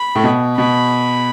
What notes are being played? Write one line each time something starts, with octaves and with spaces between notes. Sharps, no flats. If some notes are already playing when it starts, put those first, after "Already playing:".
Already playing: B5
A2
B2
B2 B5